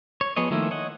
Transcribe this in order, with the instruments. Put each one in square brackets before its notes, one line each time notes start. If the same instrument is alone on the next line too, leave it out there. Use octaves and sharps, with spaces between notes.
[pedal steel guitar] C#5
F3 B3 G#4 C#5 D#5
D#3 F3 A3 A#3 E4
C#5 D#5 F#5